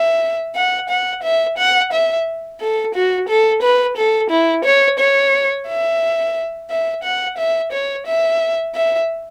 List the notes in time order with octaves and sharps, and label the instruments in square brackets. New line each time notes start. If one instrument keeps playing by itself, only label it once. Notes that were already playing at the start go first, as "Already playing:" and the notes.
Already playing: [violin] E5
F#5
F#5
E5
F#5
E5
A4
F#4
A4
B4
A4
E4
C#5
C#5
E5
E5
F#5
E5
C#5
E5
E5